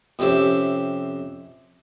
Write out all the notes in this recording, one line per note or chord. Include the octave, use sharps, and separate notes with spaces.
F2 C3 C#4 G4 E5